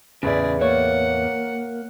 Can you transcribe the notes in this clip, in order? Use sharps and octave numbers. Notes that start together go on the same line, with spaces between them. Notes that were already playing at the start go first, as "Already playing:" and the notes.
E2 A2 C#3 G#4 B4 D5 E5
A#3 C#5 F#5